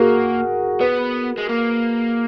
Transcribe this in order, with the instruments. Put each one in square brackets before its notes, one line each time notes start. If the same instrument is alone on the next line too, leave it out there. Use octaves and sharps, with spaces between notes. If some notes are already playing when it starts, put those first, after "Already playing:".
Already playing: [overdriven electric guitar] A#3 [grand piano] F#4 G#4 A#4
[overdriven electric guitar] B3 [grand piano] B4
[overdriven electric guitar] G#3
A#3